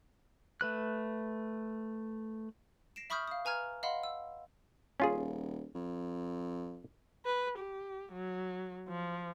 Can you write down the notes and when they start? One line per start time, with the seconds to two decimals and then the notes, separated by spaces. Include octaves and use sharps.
0.61 A3 B4 F#6
2.96 A#6 C7 D7 E7
3.10 E5 B5 C#6 D#6 F6 G6
3.28 F5 D#6
3.45 B4 G#5 A#5 F6 G#6
3.83 D#5 F5 F#5 B5 C6
4.03 E6
5.00 D#1 C#4 F4 G#4
5.75 F2
7.25 B4
7.58 G4
8.13 F#3
8.88 F3